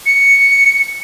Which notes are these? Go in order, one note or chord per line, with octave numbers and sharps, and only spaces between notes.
C#7